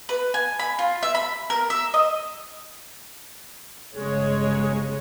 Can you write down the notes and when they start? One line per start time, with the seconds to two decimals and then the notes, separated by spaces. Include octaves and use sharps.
0.09 B4
0.34 G#5
0.59 B5
0.79 F4
1.03 E5
1.15 B5
1.50 A#4
1.70 E5
1.94 D#5
3.96 G1 C#3 G#3 C#5